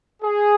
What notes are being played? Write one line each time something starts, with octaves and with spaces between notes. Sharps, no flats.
G#4